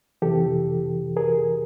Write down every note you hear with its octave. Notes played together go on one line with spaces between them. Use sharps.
F2 C3 E3 G4 A4
G#4 A#4